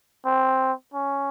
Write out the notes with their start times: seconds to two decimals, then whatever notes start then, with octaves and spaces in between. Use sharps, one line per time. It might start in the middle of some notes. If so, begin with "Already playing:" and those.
0.25 C4
0.94 C#4